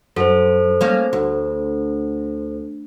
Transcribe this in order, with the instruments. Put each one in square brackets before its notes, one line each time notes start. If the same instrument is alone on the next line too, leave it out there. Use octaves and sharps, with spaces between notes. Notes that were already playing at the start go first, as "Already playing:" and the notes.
[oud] F#2 [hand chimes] A4 C5
[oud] A3 A#3 C#4
D2